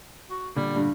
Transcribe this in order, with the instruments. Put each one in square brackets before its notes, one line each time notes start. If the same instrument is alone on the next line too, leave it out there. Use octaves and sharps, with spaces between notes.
[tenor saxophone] F#4
[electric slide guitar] A#2 D3 [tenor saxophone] G3
[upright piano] G2